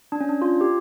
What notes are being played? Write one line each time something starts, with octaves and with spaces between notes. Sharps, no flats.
D4
C#4
D4
F4
G4